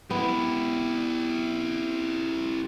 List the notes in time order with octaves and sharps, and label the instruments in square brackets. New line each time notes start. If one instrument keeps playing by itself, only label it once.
[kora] B3 [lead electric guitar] E4 G4